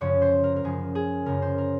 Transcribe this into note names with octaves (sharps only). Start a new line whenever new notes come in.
F#2 C#3 F3 C#5
C5
A#4
A#4
F#2 C#3 F3 G#4
G#4
F#2 C#3 F3 A#4
C5
A#4